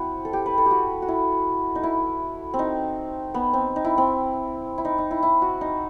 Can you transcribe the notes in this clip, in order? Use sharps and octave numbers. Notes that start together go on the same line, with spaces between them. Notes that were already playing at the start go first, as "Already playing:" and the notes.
Already playing: C4 E4 F#4
A4
G4
B4
A4
G4
F#4
F#4
E4
D#4
E4
C4
D#4
B3
C4
D#4
E4
C4
E4
D#4
D#4
E4
E4
F#4
D#4